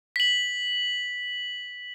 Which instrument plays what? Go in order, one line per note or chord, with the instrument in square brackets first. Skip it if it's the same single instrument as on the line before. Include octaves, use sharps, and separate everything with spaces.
[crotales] B6 F#7